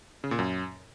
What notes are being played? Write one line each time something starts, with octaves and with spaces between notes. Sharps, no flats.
C#3
A#2
F#2